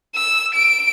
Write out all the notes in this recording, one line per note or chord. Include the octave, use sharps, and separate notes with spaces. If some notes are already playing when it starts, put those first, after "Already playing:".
E6
D7